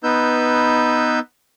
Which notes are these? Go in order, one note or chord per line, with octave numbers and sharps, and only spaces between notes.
B3 D#4 B4 E6 G6